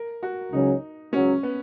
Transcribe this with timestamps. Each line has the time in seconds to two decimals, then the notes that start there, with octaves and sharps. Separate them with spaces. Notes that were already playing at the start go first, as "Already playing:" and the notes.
Already playing: A#4
0.23 F#4
0.52 C#2 C#3 F#3 C#4 D#4
1.13 C#2 C#3 F#3 C#4
1.43 B3